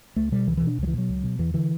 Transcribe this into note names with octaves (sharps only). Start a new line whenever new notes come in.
C#2 A3
B2 G3
C#2 E3
E3
B2
D4
C#2 F#3
E3
B2 F#3
C#2
B2
E2 E3
D3 E3